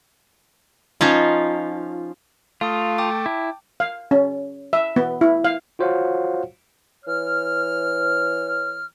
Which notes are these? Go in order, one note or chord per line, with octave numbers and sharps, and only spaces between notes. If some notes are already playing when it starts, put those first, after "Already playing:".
F3 C#4 D#4 F4
A3 F4 F5 D#6
G5 A5 D6
E4
F5
C#4
E5
B3
E4
F5
F4 F#4 C5 C#5 F5 F#5
E3 C#5 F6